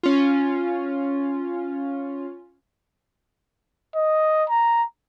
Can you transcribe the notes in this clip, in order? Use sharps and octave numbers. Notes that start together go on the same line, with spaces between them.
C#4 F4
D#5
A#5